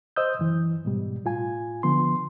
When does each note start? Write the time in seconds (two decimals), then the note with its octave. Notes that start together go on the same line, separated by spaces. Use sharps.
0.16 C5 D#5 D#6 E6 G6
0.39 F#2 E3
0.85 G#2 B2 G3
1.25 A2 F4 G#5
1.83 D3 F3 B3 C6